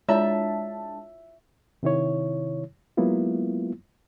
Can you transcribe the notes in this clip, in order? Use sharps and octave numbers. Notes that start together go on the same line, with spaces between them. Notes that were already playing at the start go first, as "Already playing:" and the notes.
G#3 D4 E4 F4 C#5 E5 A5
C3 D#3 E4 C#5
F#3 G#3 A#3 B3 E4 F4